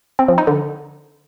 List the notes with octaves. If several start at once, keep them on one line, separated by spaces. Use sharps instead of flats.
C4
F3
D#4
D3